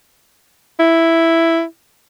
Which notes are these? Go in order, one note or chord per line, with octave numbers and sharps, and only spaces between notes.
E4